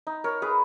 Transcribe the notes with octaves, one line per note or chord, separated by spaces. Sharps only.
D#4
A#4 C#5
G#4 B4